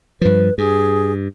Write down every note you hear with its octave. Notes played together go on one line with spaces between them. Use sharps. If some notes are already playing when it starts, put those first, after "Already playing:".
G2 F3 B4
G2 G#4